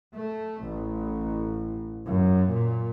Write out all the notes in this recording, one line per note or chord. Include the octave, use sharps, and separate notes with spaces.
A3
A1
F#2
A#2